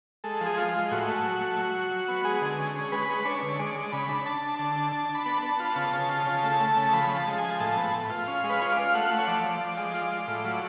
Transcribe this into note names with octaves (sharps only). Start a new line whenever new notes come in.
G#3 A4
F3
G#4
F4
F4
G#3
A2 F#4
A3
F#3
A3
F#3
F#3
F#3
B3
G#3 G#4
D3
C#4
C#4
G#3 B4
G#3
D4 C#5
D3
G#3 D5
G#3
C#3 B5
D4
D4 A5
D4
D3 A5
D4
D4 A5
D4
B5
B3
A5
B3
F4
C#3
C#3
F4
C#3
A3
A3
C#3 A5
F3 B5
F3
A5
G#3
A5
G#5
F3
A2 A5
B3
A2
F4
C#4 F5
G#3
B4
F4 C#5
F4 D5
F5
A3 F#5
A3
C#5
F3 D5
F3
F3
G#3
F4
F4
A2
F#3